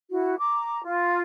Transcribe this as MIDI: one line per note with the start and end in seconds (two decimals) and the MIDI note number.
0.10 0.39 64
0.10 0.39 66
0.39 0.81 82
0.39 0.81 86
0.83 1.22 65